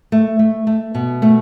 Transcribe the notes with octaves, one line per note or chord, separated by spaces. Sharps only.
A3
A3
A3
B2
A3